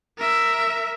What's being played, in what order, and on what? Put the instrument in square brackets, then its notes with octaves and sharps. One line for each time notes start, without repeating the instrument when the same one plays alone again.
[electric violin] A#4 E5